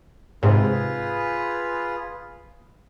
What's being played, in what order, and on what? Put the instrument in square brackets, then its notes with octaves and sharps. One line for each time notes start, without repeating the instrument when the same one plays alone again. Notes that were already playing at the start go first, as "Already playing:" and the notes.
[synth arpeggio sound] G#2 C3 [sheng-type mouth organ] F4 G#4 B4